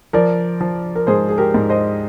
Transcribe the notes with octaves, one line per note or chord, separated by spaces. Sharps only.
F3 A#4 D5
F3
A#4
G#2 G#4 C5
G#4
G4 A#4
G#2
C5 D#5